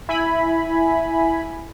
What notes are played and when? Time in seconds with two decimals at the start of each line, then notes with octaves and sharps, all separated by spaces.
0.09 E4 G#5 B5